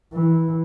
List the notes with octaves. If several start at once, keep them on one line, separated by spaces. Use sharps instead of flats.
E3